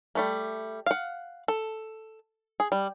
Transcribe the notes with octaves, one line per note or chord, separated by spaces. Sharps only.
G3 A3 A#3
F5 F#5
A4
G#4
G3